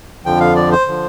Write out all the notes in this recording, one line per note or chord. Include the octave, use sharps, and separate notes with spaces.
F2 D3 F3 G5
F5
D5
C5
D3 F3